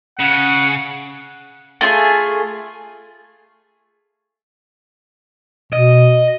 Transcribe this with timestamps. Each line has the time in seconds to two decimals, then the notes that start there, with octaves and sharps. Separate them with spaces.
0.19 C#3 F#5
1.81 A3 F4 G#4 G#5
5.73 B2 D#5